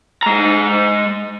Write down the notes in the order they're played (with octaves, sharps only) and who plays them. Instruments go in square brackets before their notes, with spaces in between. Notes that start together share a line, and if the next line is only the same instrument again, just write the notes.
[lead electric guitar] G#3 A#5